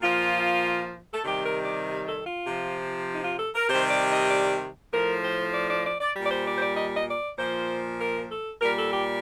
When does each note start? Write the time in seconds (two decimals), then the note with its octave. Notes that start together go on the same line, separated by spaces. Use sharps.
0.01 A#2 F3 F4
1.13 A4
1.24 C3 D#3 G3 G4
1.45 A#4
1.65 D5
2.06 A4
2.27 F4
2.47 C3 F3
3.15 D#4
3.24 F4
3.39 A4
3.55 A#4
3.69 C3 D#3 G3 C5
3.90 D5
4.11 D#5
4.31 D5
4.93 A2 F3 A#4
5.23 C5
5.54 D5
5.69 D5
5.85 D5
6.00 D5
6.15 A#2 G3
6.24 D5
6.31 C5
6.46 D5
6.57 C5
6.61 D5
6.76 D#5
6.95 D#5
7.08 D5
7.38 A#2 F3 C5
7.99 A#4
8.30 A4
8.61 A#2 G3 A#4
8.76 A4
8.92 G4